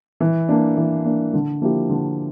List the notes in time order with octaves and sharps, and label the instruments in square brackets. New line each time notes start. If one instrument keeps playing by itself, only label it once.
[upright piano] E3
A#3 D4
E3
A#3 D4
D3
F3 A#3 E4 G4
D3